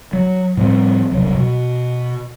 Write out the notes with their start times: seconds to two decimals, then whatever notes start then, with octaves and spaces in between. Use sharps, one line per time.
0.13 F#3
0.57 A2 F3 G3 C4
1.12 E1 C2 F#3
1.37 B2